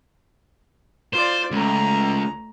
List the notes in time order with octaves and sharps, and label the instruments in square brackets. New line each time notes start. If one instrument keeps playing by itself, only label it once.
[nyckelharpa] F4 D5 [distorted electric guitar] C5
[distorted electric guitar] C#2 [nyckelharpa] A3 A#5